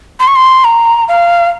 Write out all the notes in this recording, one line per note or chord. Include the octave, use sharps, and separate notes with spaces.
C6
C#6
C6
A#5
F5